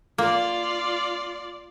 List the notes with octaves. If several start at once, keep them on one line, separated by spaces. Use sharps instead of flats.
A#3 F4 D5